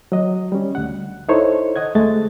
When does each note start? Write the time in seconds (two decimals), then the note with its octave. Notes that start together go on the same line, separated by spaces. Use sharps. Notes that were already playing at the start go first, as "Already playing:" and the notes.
0.12 F#3 D#5
0.52 G3 C#4
0.75 D2 F#5
1.29 D#4 E4 A4 C5 C#5
1.76 D#5 F#5 G#6
1.95 D2 G#3 A3 D#5 A6